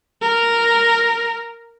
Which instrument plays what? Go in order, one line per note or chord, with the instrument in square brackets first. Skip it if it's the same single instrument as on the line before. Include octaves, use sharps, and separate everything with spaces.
[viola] A#4